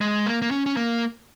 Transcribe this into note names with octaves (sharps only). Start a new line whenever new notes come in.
G#3
A#3
A#3
C#4
C#4
A#3